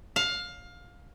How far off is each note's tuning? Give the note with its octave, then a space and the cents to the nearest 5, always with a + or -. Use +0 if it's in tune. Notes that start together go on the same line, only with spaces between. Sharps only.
F5 +20